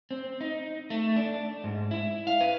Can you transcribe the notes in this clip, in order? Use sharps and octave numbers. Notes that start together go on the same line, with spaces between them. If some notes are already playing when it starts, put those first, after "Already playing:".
C4
D#4
A3
D4
G#2
E4
F5
B4